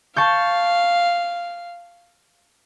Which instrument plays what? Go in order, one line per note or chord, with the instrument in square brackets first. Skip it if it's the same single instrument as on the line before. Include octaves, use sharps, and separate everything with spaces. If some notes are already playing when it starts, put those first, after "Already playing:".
[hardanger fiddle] F5 [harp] A5 C#6 G6